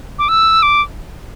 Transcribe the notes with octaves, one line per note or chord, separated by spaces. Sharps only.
D6
E6
D6